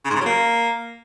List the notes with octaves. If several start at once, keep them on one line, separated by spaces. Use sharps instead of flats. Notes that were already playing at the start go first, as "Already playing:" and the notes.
C#3
G#2
C#3
F#3
A#3